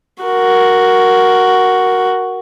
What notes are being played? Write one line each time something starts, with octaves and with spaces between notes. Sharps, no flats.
F#4 A#4